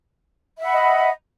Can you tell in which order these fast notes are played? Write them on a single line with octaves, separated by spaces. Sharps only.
E5 F#5 B5 D#5